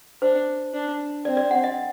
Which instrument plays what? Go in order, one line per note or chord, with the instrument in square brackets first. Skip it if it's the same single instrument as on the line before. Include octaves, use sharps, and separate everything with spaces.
[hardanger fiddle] D4 [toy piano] C5
[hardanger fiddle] D4
[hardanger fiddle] C4 [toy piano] D5
[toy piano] D5
F#5
D#5